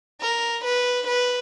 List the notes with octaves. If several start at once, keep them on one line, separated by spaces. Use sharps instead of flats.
A#4
B4
B4